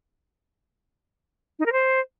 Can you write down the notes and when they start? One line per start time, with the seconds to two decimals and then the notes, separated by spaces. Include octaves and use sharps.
1.59 D#4
1.66 A#4
1.72 C5